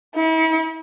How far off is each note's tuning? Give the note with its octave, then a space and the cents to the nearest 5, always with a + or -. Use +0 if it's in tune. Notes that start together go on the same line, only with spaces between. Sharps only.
E4 -40